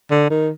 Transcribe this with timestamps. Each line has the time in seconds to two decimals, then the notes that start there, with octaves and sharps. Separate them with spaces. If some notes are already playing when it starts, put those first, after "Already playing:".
0.11 D3
0.30 D#3